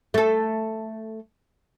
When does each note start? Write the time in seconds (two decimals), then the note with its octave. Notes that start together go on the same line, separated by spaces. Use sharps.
0.14 A3 A4